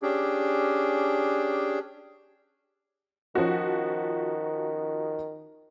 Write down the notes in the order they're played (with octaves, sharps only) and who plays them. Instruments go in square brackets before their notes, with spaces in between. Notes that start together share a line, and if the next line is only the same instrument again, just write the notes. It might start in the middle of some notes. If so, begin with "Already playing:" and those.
[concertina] C#4 D4 G4 G#4
[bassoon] D#3 [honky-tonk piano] F3 C#4 F#4